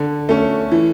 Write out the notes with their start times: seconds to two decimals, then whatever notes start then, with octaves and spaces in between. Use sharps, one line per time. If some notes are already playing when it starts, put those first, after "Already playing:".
Already playing: D3
0.29 A3 C#4
0.71 E3